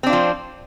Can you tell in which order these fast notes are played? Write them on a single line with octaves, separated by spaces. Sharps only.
C4 D4 F4 F3